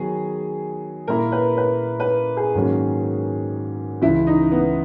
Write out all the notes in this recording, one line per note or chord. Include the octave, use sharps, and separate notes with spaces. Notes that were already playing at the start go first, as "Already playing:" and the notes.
Already playing: D#3 F#3 B3 G#4
A#2 A#3 E4 A#4
B4
B4
B4
G#4
G#2 D#3 F#3 A#3 C#4
C#2 C#3 E3 E4
D#4
B3